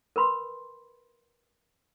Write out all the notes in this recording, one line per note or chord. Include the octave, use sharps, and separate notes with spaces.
A#4 B4 B5 C6